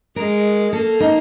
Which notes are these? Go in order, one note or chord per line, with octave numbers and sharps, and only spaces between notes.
G#3 A#4
A#3 A4
D#4